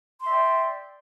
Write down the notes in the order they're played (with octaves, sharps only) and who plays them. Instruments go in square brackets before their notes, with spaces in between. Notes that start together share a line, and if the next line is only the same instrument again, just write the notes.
[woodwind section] C6
E5
D5
G5